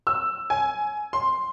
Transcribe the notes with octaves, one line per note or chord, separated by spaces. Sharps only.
E6
G#5
C6